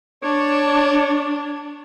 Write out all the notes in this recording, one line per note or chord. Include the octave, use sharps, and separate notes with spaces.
D4 C#5